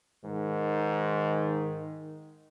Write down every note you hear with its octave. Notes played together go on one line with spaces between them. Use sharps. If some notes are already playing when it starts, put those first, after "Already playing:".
G#2 D#3